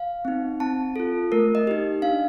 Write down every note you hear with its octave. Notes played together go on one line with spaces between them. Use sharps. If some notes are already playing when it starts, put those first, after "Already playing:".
Already playing: F5
C4 D#4
C4 A5
F4 A4
A3 A#4
D#5
D#4 G4
D4 F5